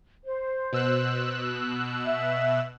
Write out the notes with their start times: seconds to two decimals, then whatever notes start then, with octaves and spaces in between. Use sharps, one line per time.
0.24 C5
0.73 B2 E6 F#6
2.06 E5